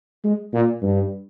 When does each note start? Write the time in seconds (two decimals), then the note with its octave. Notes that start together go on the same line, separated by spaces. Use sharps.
0.25 G#3
0.53 A#2
0.82 G2